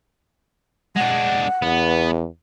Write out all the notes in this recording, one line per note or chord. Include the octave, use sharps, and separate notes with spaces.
G#3 D4 F#5
E2 B3